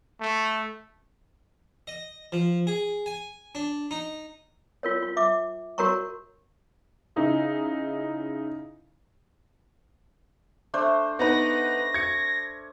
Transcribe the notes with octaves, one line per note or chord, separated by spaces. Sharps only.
A3
D#5
F3
G#4
G#5
D4
D#4
F4 A#4 C#5
F4
E5 D6
F#4 A#4 C#5 A#5 C#6
C#3 D#4 E4
A3 D4 C5
B3 D#4 B4 A#6
G#6 C#7